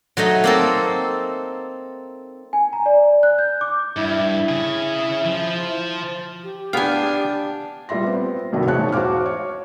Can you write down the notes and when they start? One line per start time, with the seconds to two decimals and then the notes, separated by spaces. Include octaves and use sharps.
0.17 F#3 A3 D#4 D#5
0.44 A#3 C4 A4
2.53 G#5
2.73 A#5
2.86 D5
3.23 F#6
3.39 G6
3.61 D6
3.96 G2 E4
4.49 C#3 G#4
5.25 F3
6.43 G4
6.73 B3 D4 F5 G5 G#5
7.89 A#2 G3 E5 C6 A#6
8.03 B3 C4
8.53 B1 G2 C3 D#3 F#3 A3
8.66 E1 E2 G#2 C#5 A5 F#6
8.92 F#4 C5 F5 D6 F6
9.26 C#5